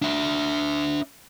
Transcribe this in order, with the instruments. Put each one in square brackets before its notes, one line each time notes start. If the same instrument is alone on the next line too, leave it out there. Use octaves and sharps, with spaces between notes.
[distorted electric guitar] D4 E5